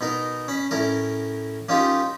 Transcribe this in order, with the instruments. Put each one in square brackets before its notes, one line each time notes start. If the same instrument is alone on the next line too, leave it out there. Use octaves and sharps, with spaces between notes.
[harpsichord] B2 D#4 A#4
C#4 B5
A2 C#4 A#4
A#3 C#4 D#4 F4 G4